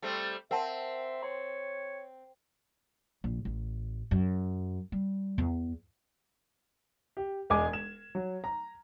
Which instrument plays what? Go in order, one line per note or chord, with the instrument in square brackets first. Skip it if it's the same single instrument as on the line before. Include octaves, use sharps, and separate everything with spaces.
[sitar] G3 A3 C4
[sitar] C4 [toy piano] A#4 F#5 A5 [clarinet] E5
[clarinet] C#5 [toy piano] C6
[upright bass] A#1
A1
F#2
G3
E2
[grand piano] G4
E1 G#3 G#5 D6 G#6
E7
F#3
A#5